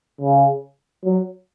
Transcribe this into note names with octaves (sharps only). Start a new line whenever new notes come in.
C#3
F#3